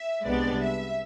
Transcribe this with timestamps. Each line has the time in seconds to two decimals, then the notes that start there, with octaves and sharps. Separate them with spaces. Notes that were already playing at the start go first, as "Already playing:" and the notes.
Already playing: E5
0.25 C2 C3 G#3 B3 D4 D5
0.61 E5